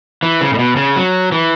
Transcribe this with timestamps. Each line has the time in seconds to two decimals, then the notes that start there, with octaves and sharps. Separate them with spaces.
0.23 E3
0.41 C#3
0.54 A2
0.59 B2
0.76 C#3
0.96 F#3
1.32 E3